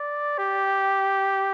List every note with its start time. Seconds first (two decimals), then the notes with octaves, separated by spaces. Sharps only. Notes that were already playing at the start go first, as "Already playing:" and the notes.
Already playing: D5
0.38 G4